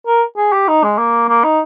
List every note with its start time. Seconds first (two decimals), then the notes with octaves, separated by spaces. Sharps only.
0.07 A#4
0.37 G#4
0.52 G4
0.68 D#4
0.83 G#3
0.98 A#3
1.29 A#3
1.44 D#4